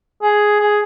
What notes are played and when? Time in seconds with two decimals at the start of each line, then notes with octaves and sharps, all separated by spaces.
0.22 G#4
0.59 G#4